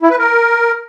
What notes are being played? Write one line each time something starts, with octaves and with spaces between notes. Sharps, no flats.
E4
B4
A#4